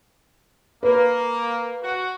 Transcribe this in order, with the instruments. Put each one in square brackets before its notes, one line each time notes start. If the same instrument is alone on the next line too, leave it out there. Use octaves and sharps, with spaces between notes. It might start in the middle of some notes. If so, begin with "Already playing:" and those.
[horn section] A#3 [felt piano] B4
[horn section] F#4